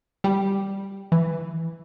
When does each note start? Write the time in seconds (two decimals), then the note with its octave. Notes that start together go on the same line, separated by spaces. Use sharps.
0.24 G3
1.12 E3